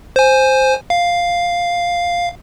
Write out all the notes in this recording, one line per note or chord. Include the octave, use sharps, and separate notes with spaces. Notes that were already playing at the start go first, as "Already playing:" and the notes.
C5 G#5
F5